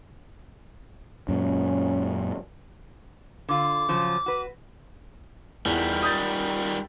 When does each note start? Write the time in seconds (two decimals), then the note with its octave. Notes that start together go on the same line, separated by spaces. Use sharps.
1.29 F#2 A#2 C#4
3.49 D3 F4 D6
3.88 C#3 F3 F#3
4.26 F#4 B4
5.66 E2 D#3 G3
6.03 D#6 G6 A6